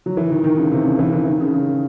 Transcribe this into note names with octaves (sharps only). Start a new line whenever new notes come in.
F#3
E3
D#3
D#3
C#3
C3
C#3
E3
E3
D#3
C#3
C#3